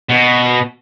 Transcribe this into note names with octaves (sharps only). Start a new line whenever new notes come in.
B2